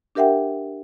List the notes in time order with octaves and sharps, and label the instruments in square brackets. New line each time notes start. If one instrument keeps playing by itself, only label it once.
[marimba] D4 G4 A#4 E5 F#5 G5